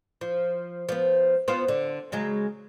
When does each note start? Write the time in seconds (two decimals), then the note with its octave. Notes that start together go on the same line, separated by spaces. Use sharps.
0.21 F3
0.89 F3 B3
1.48 B3 C4 F4
1.68 D3
2.12 C#3 F#3 G#3